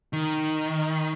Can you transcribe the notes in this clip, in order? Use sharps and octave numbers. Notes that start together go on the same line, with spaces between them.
D#3